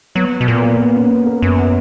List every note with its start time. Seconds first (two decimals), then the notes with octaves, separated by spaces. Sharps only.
0.15 F#3 B3
0.41 B2
0.48 A#2 A#3
0.54 B3
0.62 A#3
0.79 B3
0.95 C#4
1.11 B3
1.26 A#3
1.42 F#2 B3
1.59 B3